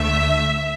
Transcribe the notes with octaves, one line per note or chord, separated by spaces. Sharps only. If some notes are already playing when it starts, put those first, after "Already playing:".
Already playing: D2 D3 A3 E5